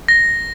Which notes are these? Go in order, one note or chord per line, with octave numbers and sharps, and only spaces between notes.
A#6